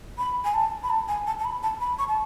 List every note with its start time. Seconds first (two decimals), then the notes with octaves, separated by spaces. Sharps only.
0.18 B5
0.45 G#5
0.54 A5
0.83 B5
0.90 A5
1.08 G#5
1.27 A5
1.39 A5
1.45 B5
1.63 A5
1.81 B5
1.99 C#6
2.08 A5